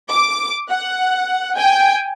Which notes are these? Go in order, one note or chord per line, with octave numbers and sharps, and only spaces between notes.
D6
F#5
G5 G#5